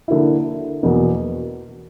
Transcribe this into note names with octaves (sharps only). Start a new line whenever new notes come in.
D3 A#3 E4
E2 B2 A#3